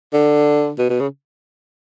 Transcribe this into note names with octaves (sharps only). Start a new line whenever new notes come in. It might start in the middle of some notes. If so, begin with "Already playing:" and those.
D3
B2
B2
C#3